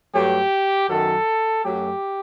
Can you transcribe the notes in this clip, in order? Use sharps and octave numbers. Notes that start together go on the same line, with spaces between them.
G2 F#3 A3 G4
F#2 D#3 F#3 A4
F#2 F#3 A3 G4